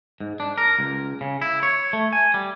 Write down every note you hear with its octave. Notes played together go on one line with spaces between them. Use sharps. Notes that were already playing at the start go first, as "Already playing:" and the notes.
G#2
D4
A#4
C#2
C#3
E4
C#5
A3
G#5
G3